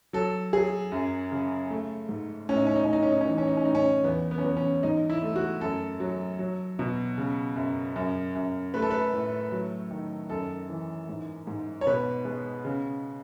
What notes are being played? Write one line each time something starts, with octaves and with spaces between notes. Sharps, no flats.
F#3 A4
F#3 G#4
F#2
C#3
A3
G#2
A2 C#4
D#4
C#4
D#4
A2 C#4
D#4
C#4
D#4
C#4
E3 D#4
C#4
D#4
C#4
A2 D#4
C#4
E2 B3
B3
C#4
E2 B3
C#4
G#2 D#4
E4
A3
F#4
F#2 A4
F#3
F#3
B2
C#3
F#2
F#2
F#2
A3 B4
A4
B4
A2
F#3
D#3
F#2 A4
E3
G#2
G#2
C#5
B2 B4
G#3
C#3